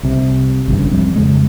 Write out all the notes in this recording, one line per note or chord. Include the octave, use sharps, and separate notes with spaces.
C2 C3
G#1 C#2 G2 C#3
E1 F3 G3 C4
F2 C#3 G#3